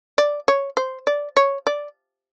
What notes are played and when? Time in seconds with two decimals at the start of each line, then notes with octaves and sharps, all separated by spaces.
0.18 D5
0.48 C#5
0.77 C5
1.07 D5
1.37 C#5
1.67 D5